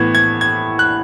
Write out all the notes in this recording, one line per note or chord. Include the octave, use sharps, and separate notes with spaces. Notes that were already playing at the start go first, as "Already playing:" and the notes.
Already playing: A2 E3 B3 G#6
G#6
G#6
F#6